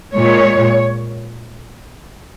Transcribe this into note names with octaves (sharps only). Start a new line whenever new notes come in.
A#2 G#3 C#5